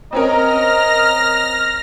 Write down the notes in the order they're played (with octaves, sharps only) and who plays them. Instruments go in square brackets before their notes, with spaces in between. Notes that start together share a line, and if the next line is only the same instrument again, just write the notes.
[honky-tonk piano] C4 C#4 A#4 [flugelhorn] D#5 [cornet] A#5 [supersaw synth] F6 A#6